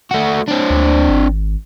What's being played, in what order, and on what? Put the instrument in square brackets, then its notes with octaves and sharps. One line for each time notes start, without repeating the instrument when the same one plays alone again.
[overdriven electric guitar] A3 F#4
C4 D4
[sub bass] D2
G#1